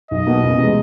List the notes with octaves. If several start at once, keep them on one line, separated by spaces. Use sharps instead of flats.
B1 D#5
B2 F#3 A#3
C#2
C3 E3 G#3